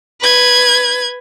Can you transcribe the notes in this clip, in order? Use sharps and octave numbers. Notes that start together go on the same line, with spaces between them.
B4 G#6